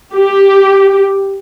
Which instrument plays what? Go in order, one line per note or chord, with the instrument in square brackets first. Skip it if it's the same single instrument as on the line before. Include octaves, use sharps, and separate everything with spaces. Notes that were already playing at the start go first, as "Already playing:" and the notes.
[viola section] G4